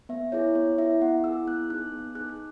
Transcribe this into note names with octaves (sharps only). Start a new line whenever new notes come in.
B3 E5
E4 G#4 C#5
B3 C#5
E4 G#4 E5
B3 F#5
E4 G#4 E6
B3 F#6
D#4 G#4 F#6
B3
D#4 G#4 F#6
F#6